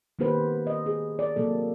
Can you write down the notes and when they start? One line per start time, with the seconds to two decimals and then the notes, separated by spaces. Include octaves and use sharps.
0.19 D#3 A#3 B3 G4 B4 C5
0.67 D#5
0.86 G#4
1.19 D5
1.36 C3 F#3 A#3 A4